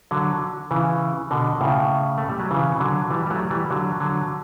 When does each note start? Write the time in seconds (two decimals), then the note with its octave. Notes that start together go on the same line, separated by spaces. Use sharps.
0.11 D3 F#3
0.71 C#3 E3
1.31 B2 D3
1.61 A2 C#3
2.18 A3
2.29 G3
2.40 F#3
2.51 C#3 E3
2.80 D3 F#3
3.10 E3 G3
3.26 G3
3.30 F#3 A3
3.51 E3 G3
3.70 D3 F#3
4.00 D3 F#3